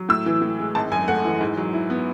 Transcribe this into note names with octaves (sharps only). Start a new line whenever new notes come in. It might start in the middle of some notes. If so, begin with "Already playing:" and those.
Already playing: F#3
A2 E6
E3
A2
G#3
G#1 A5
F#2 G#5
A3 F#5
E3
G#2
F#3
E4
B3